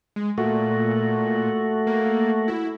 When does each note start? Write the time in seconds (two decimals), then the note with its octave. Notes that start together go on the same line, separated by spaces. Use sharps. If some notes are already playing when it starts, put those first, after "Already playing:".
0.16 G#3
0.38 A#2 A3 F#4
1.87 A#3
2.48 E4